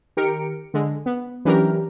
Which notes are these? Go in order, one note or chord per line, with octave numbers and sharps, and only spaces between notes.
D#3 G4 A#4 C#7 D7
D3 G#3
B3
E3 F#3 C#4 D4 G4 A#4